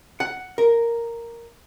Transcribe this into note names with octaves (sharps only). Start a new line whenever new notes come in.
F#5
A#4